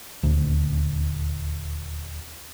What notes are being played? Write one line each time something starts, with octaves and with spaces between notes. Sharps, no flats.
D#1 D2